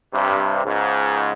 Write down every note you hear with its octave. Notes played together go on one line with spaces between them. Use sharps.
G2 C3
C#2 G#2